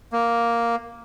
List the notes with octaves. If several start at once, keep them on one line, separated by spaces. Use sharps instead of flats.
A#3